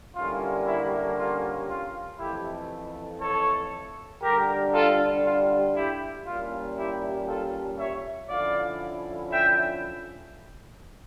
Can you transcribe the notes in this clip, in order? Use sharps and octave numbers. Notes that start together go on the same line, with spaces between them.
D3 G3 A#3 C#4 E4 F4
E4
F4
F4
F2 E3 A3 E4 G4
A4 C#5
D3 G3 D4 G4 A#4
F4 A4
F4
E4 G4
A#2 G3 C#4 E4 F4
E4 G4
F4 A4
C#5 E5
D3 F3 C#4 E4 D5 F5
E5 G5